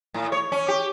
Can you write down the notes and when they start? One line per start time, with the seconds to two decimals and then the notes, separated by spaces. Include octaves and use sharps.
0.14 A2
0.32 C#5
0.52 C#4
0.68 G4